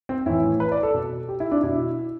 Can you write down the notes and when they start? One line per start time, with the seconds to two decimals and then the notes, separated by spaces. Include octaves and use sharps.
0.09 C4
0.26 A2 E3 E4
0.60 B4
0.72 D5
0.83 A4
0.94 B2
1.29 G4
1.40 E4
1.51 D4
1.63 B2 E4